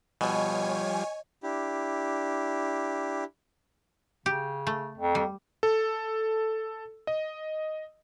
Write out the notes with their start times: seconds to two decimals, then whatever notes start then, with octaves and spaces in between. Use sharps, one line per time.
0.21 B2 F3 G3 C#5 D#5 G#5
1.43 D4 E4 G4
4.26 C#3 G4
4.67 A3
4.98 F2
5.15 G3
5.63 A4
7.07 D#5